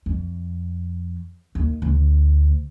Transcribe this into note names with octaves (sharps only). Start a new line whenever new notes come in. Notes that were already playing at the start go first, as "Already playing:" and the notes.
F2
D#2
D2